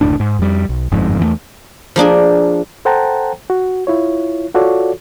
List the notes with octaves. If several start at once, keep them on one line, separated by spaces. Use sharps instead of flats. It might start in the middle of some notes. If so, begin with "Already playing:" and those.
F#1 D2 A2 D4
G#2
F2 G3
B1
G1 F2 G#2
E2 D#3 A3
F3 A#3 D4 G#4
A4 C5 F#5 G5 A5 A#5
F#4
E4 F4 C#5
F4 F#4 A4 C#5 D5